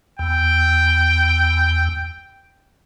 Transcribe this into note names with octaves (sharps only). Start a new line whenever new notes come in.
E2 G5